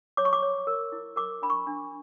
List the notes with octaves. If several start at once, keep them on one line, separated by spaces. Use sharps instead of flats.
C#5 D6
C#6
D6
C#5
A#4
E4
A#4 D6
D4 B5
C#6
D4